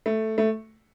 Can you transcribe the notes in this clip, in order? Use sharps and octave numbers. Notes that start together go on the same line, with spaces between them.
A3
A3